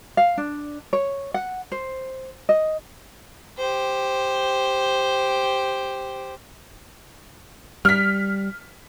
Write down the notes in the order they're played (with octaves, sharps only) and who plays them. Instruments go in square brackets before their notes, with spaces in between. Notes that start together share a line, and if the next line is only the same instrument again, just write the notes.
[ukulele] F5
D4
C#5
F#5
C5
D#5
[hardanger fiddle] G4 C5
[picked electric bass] G3 [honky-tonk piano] F6 B6